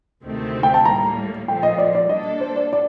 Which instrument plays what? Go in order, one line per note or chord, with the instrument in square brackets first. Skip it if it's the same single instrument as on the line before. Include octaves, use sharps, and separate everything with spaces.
[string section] D2 C3 D#3 A3 C4
[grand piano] G5
A5
[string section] A2 G3 A#3 [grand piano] A#5
[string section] A#2 F3 A3 [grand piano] G5
[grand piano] D#5
D5
D5
[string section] G3 A#3 D4 A4 [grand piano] D#5
[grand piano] C5
D5
D5